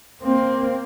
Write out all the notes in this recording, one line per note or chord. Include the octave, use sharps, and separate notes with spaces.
A#3 C4